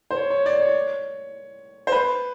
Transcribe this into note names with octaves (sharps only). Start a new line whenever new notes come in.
C5
C#5
C#5
D5
C#5
C5
B4